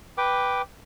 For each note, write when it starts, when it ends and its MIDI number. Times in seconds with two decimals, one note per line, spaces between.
0.18 0.62 71
0.18 0.62 79
0.18 0.62 86